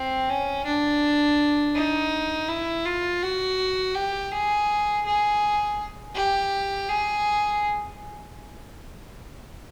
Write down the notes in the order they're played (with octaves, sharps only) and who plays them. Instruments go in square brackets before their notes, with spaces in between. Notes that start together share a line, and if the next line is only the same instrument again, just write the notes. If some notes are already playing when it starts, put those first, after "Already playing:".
Already playing: [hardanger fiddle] C4
C#4
D4
D#4
E4
F4
F#4
G4
G#4
G#4
G4
G#4